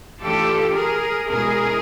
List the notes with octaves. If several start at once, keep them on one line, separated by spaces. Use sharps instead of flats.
E3 A3 D4 F4 G4 A4
G#4 A#4
B2 G#3 C#4 E4 G#4 A#4